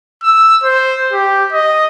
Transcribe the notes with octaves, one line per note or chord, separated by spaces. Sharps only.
E6
C5
G4
D#5